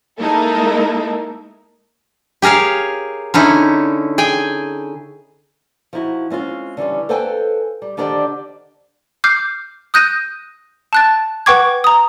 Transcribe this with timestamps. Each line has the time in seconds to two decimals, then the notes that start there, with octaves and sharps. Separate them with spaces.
0.20 G#3 A#3 D#4 E4 A4 A#4
2.42 G4 G#4 A#4 C#5 F5
3.34 D3 C#4 D#4 E4
4.18 G#4 G5 G#5
5.93 F3 D#4 E4 F#4
6.30 G#3 C4 C#4 F4
6.77 D3 E3 G3 C#4
7.09 A4 B4 C5 F5 G5 G#5
7.82 G3
7.97 D3 D#3 D4 G4 C5 D5
9.24 D6 F6 G6 C7
9.94 D#6 F#6 G6 A#6 D#7
10.93 A5 F#6 A6
11.46 B4 F#5 G5 C#6 D6 G#6
11.84 A#5 D#6